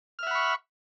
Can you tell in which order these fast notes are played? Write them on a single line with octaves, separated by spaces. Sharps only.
F6 E5 F#5 B5 C#6